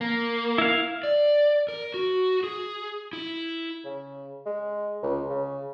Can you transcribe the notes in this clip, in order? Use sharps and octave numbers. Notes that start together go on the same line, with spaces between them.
A#3
E4 F5
D5
A#4
F#4
G#4
E4
C#3
G#3
C#2
C#3